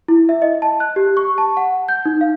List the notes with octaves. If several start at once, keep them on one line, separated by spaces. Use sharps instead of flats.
E4
E5
D#5
A5
F#6
G4
C#6
A5
F#5
G6
D#4
F5